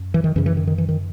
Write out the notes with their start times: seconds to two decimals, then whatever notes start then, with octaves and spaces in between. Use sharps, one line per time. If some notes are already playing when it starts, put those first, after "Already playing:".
Already playing: F#2
0.14 E3
0.24 D#3
0.36 F#2 C#3 E3
0.46 E3
0.57 D#3
0.67 D#3
0.78 E3
0.89 D#3